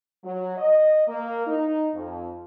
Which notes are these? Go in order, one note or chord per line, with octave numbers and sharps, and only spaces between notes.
F#3
D#5
A#3
D#4
F2